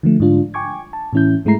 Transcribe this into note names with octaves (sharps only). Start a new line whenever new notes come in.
D3 F3 A3
G#2 D3 D4 F4
G5 G#5 C#6 D6 G#6
A5
A2 E3 C#4 E4 G6
G#2 G#3 A3 E4 A#5 C7